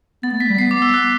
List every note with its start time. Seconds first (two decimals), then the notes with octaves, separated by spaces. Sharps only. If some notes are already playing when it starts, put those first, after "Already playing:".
0.23 B3 A6
0.33 A3
0.40 B6
0.49 G3
0.59 B3 C7
0.71 D6
0.82 E6
0.94 F#6